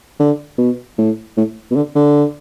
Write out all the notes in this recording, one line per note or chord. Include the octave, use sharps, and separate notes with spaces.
D3
B2
A2
A2
B2
D3
D3